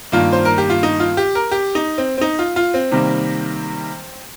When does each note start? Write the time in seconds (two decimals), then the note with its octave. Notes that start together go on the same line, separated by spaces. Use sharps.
0.12 G2 D#3 A#3 F4
0.33 C5
0.45 A#4
0.58 G4
0.70 F4
0.83 D#4
1.00 F4
1.17 G4
1.35 A#4
1.51 G4
1.75 D#4
1.98 C4
2.18 C4
2.21 D#4
2.39 F4
2.56 F4
2.74 C4
2.91 C3 D#3 G3 A#3